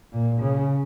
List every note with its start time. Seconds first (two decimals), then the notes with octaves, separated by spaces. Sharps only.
0.12 A#2
0.41 C#3